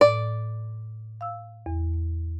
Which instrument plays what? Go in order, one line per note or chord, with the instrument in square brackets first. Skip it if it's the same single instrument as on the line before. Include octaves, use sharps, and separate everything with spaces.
[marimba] A2 [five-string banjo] D5
[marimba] F5 E6
E2